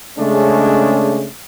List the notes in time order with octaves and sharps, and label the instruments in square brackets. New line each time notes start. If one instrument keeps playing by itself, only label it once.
[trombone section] C#3 G#3 A3 C#4 D4 G#4